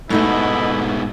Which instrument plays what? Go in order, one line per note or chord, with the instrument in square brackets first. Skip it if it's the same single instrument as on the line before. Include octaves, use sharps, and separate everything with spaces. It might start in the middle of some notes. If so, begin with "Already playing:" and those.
[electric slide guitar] G#2 B2 [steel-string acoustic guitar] A3 D#4 D#5 [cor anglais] E4